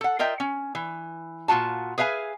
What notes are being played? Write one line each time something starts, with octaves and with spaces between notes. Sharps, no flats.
A4 F#5
F4 A#4 D#5 E5 G5
C#4
E3
A#2 C#4 F4 F#4 A5
G#4 B4 E5 F5 G#5